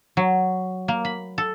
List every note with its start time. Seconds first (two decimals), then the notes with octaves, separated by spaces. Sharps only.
0.17 F#3
0.88 A#3
1.05 B5
1.38 A4